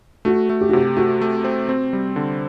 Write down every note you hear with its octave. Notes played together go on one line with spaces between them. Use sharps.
A3 F#4
A3
G4
F#4
C3 G4
A3 F#4
A3
C4
C4
G3
D3